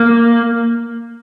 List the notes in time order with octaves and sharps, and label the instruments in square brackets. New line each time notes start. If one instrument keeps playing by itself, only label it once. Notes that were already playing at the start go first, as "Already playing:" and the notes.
Already playing: [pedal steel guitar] A#3